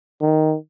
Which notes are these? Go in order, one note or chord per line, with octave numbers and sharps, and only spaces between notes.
D#3